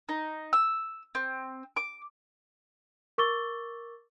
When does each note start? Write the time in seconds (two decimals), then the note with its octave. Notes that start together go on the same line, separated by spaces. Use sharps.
0.09 D#4
0.53 E6
1.15 C4
1.77 D6
3.18 A#4 C#6 D6 E6 A6 G7